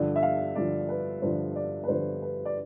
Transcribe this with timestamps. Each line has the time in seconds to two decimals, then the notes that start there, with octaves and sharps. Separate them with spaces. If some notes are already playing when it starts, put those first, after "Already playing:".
Already playing: G2 D3 F3
0.16 E5
0.23 F5
0.55 G2 D3 F3 D5
0.89 B4
1.22 G2 D3 F3 C5
1.56 D5
1.84 B4
1.88 G2 D3 F3 C5
2.22 B4
2.45 D5